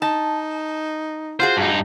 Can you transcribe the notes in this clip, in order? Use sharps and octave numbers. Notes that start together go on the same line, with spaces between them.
D#4 A5
F4 F#4 G#4 C5
G2 D#4